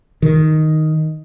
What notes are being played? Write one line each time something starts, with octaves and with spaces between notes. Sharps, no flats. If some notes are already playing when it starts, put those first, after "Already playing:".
D#3